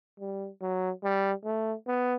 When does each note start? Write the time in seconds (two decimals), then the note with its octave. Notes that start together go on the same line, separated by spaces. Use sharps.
0.20 G3
0.61 F#3
1.03 G3
1.45 A3
1.87 B3